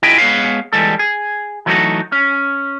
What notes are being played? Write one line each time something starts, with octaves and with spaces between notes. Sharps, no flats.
E4 F4 G#4 D#5 E5 G5
G#3 B3 G#4 B4 C#5 F5
E3 G3 G#3 A4
G#4
E3 F#3 A3 B3 D#4 F#4
C#4